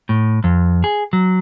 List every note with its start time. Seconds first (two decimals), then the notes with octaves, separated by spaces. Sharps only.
0.09 A2
0.44 F2
0.84 G#4
1.13 F#3